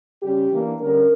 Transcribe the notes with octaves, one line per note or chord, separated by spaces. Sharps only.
C#3 G3 C#4 G4
E3 A#3 D4
D3 G3 C#4 A#4